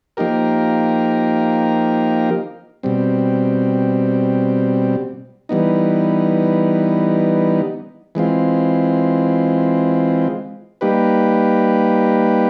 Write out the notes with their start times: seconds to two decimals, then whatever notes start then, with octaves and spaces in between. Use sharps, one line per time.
0.17 F3 A#3 D#4 G4 A#4
2.83 B2 G3 C4
5.49 E3 G3 B3 D#4
8.15 E3 G#3 C4 F4
10.81 G3 A#3 D#4 G4 B4